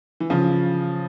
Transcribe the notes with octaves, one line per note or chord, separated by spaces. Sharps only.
E3
C#3 F3